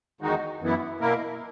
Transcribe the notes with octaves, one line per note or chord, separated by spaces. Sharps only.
E2 D#3 G#3 D#4 F#4
F#2 E3 B3 E4
B2 A#3 E4 A#4